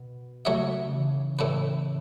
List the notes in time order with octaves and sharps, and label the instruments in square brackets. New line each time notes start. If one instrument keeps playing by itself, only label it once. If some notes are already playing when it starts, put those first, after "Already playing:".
Already playing: [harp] B2
[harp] C#3 [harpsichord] F#3 A3 F#4 C#5 E5
[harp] C#3
E3
[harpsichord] A2 A3 E4 B4